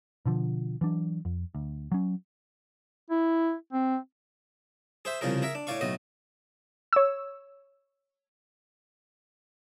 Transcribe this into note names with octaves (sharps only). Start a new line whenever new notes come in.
B2 D3 F3
E3 F#3 D4
F2
D2
F#3 C#4
E4
C4
G#4 C5 E5
C2 C#3 F3 G#4 A#4
G#4 A#4 E5
D4
A2 C#5 D5 F5 C#6
B1 A2 F#4 D#5
C#5 E6